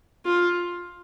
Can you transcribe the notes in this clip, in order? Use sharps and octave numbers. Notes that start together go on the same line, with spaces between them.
F4